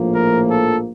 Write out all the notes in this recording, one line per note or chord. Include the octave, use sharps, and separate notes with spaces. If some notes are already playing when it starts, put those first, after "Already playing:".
Already playing: A#1 A2 F3 A#3
A#4
A4